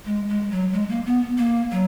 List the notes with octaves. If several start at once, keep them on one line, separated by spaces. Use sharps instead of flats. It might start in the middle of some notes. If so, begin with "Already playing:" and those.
G#3
G#3
F#3
G#3
A#3
B3
A#3
F#3